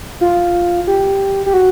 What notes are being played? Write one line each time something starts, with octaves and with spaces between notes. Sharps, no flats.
F4
G4
G4
F#4